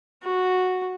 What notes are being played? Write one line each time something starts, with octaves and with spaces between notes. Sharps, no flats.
F#4